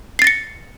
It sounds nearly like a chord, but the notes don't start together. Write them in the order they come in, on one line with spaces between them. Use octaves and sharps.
C7 A6 A#6 C#7